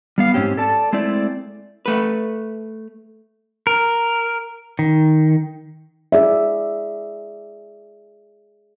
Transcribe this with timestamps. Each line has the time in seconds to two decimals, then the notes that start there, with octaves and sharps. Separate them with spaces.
0.18 G3 B3 F5
0.34 G#2 C4 C#4 G4
0.57 A4 D5 A5
0.93 G#3 A3 C4 E4 D5
1.86 A3 B4
3.67 A#4
4.79 D#3
6.12 G#4 D5 E5